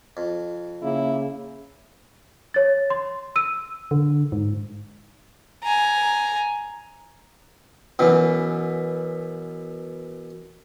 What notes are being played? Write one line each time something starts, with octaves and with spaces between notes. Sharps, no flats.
F2
C#3 A#3 E4
C#5 A6
C6
E6 D#7
D3
G#2
G#5 A#5
F#2 B2 E3